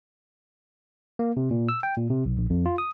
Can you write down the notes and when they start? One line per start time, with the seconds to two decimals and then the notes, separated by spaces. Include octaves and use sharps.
1.19 A#3
1.37 C3
1.51 A#2
1.69 E6
1.83 G5
1.97 A#2
2.10 C3
2.25 B1
2.38 A#1
2.50 F2
2.66 F4
2.78 D#6